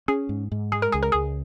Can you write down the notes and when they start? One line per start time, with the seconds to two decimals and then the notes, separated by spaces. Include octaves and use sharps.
0.08 C#4 G#4
0.29 G#2
0.52 G#2
0.72 G#3 G#4
0.82 A#4
0.92 C#2 G#4
1.03 A#4
1.12 C#2 G#4